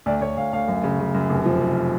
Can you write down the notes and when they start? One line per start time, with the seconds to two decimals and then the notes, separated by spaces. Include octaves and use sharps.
0.06 D2 D5
0.21 D2 C#5
0.37 D2 F5
0.53 D2 F5
0.68 F#2
0.84 C#3
1.00 C#3
1.14 F#2
1.30 F1
1.46 F3
1.61 F1